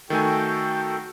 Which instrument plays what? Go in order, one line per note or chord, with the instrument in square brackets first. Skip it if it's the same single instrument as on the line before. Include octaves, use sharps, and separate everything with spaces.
[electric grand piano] D#3 A3 G#5 [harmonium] F#4 A4 G5